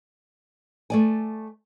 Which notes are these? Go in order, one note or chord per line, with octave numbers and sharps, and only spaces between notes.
A3 D5 G#5